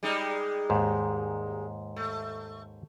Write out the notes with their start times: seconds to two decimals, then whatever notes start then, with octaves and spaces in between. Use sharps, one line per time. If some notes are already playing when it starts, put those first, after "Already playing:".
0.03 G3 G#3 D#4
0.70 D#2 G#2
1.96 A3